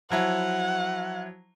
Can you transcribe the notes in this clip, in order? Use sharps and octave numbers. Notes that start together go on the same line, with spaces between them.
F3 F#3 E4 F#5